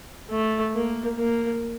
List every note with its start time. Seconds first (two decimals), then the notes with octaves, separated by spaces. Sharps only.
0.30 A3
0.74 A#3
1.18 A#3